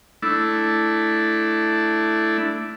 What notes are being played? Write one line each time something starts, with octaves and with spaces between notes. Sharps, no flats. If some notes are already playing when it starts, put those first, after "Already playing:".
A3 D4 E4